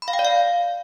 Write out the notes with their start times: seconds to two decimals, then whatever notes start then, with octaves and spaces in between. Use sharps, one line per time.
0.02 B5
0.08 F5
0.13 G5
0.19 D5
0.25 F5